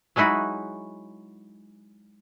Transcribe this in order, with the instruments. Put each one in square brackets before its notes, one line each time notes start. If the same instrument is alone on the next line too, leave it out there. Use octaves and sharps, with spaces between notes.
[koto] F#3 G#3 D#4 E4 F#4